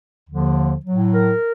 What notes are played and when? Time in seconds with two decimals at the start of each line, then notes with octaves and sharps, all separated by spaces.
0.28 D#2 D3 F3
0.86 A2 F#3
1.14 A#4